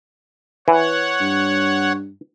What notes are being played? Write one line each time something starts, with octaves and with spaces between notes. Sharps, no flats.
E3 C#5 F#5
G2